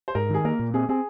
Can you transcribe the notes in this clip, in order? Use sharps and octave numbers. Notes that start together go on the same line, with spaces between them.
C5
G#2 A#4
D#3 G#4
A#3 A#4
A#2
C4 G#4
C4 G#4